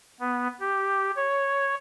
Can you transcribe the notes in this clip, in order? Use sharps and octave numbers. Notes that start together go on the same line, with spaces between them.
B3
G4
C#5